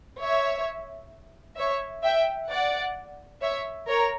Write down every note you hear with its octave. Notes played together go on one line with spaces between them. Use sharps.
C#5 E5
C#5 E5
E5 G5
D5 F#5
C#5 E5
A#4 C#5